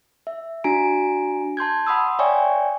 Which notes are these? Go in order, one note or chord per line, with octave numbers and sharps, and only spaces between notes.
E5
D4 F#4 G#5 A#5 D7
A5 C6 G6 G#6
F#5 B5 C6 D#6 E6
C#5 D5 E5 G5 G#5 C#6